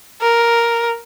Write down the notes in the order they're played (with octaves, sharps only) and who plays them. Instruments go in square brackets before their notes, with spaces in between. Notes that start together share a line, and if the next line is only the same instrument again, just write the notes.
[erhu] A#4